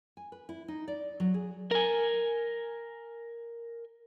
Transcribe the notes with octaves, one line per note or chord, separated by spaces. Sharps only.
G#5
B4
E4
D#4
D5
F#3
G#4
A#4 G#5